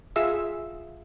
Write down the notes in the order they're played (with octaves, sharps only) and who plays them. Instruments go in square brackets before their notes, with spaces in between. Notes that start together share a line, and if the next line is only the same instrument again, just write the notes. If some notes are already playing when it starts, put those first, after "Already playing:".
[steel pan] F4 G#4 E5 E6